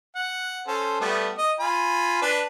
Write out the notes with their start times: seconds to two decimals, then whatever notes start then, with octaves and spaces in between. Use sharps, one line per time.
0.15 F#5
0.67 C#4 A4 C5
1.01 G3 A3 B3
1.38 D#5
1.59 F4 G#5 B5
2.22 D4 B4